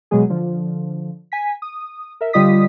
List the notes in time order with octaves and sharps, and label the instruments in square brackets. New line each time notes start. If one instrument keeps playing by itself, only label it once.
[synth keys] B2 F#3 G#3 G#4
D3 F3
G#5 B6
D#6
A#4 E5
D3 G3 F4 D#5 D#6 B6